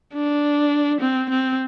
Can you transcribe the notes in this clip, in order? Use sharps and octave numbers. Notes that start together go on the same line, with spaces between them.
D4
C4
C4